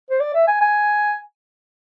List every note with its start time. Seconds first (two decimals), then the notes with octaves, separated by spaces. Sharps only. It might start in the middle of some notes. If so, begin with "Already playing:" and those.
0.10 C5
0.20 D5
0.34 E5
0.47 G#5
0.61 G#5